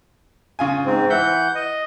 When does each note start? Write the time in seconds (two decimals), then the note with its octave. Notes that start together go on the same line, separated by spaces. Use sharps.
0.59 C#3 F4 G#5
0.85 G#2 C4
1.10 E3 E5 F#5 G6
1.55 D#5